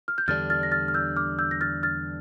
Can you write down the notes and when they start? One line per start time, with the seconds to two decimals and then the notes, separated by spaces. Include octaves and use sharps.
0.08 F6
0.18 G6
0.28 E2 D3 G3 D4 F6 A6
0.50 F6 A6
0.63 A#6
0.72 F6 A6
0.88 F6
0.94 E6 G6
1.16 D6 F6
1.39 E6 G6
1.51 A#6
1.61 F6 A6
1.83 F6 A6